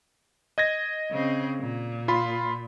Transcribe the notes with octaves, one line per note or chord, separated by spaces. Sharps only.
D#5 G#6 A#6
C#3 C4
A#2
F4 B5 C6